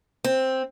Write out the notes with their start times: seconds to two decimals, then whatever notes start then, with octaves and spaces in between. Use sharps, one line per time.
0.24 C4